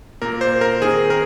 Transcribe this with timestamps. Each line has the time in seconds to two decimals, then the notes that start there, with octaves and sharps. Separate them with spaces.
0.22 A#2 A#3 A#4
0.41 C5
0.61 A#4
0.81 D#3 C4 G#4
1.10 A#4